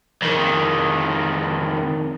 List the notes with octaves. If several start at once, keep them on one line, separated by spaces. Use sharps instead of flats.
F2 D#3